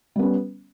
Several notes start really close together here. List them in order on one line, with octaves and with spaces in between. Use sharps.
G3 B3 C#4